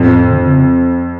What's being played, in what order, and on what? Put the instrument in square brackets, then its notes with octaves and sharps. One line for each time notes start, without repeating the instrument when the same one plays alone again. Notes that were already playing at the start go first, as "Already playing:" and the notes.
Already playing: [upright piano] F2 [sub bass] A2
[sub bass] D3
C#3